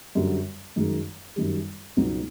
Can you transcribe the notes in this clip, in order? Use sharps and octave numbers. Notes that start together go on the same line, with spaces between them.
F#2 D3 G3
F#2 D#3 G#3
F#2 D#3 G3
C#2 B2 F#3 B3 D#4